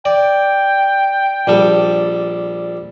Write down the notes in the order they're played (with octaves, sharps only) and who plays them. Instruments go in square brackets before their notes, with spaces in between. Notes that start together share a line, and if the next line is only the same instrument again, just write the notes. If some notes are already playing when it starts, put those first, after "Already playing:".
[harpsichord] D5 [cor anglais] G5
[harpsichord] A#1 G3 A4